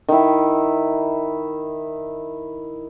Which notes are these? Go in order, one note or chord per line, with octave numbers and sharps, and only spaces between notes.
D#3 E4